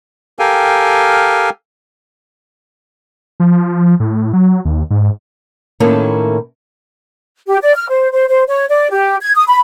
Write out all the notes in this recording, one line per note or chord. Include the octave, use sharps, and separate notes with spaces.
G4 A4 A#4 F5 G5 G#5
F3
A2
F#3
D#2
G#2
A2 D#3 A#3 C#4 E4 A4
G4
D5
F6
C5
C5
C5
C#5
D5
G4
G#6
D#6
B5